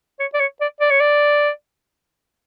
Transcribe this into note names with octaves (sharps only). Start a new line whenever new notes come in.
C#5
D5
C#5
D5
D5
C#5
D5